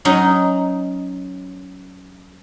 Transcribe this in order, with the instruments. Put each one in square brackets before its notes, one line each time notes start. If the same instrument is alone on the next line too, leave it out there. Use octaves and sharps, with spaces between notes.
[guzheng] F#3 C#4 D#4